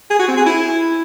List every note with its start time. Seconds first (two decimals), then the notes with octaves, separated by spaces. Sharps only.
0.11 G#4
0.19 F#4
0.28 C4
0.37 G#4
0.46 E4